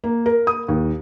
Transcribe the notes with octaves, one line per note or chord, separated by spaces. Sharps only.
A#3
A#4
D#6
D#2